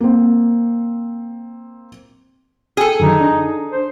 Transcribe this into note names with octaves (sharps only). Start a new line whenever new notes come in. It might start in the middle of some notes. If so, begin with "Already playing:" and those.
A#3 C4
G#4 A4 G5
F#2 D3 D#3 D#4
D4
C5